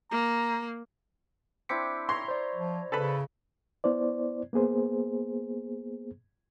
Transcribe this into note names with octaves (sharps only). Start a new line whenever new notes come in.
A#3 A#5
C4 D4 E4 D6 B6 C#7
C#5 A#5 C6
C5 D5
F3
C#3 A4 B4 B5
B3 E4 C5 D5
A#3 B3 G#4 C5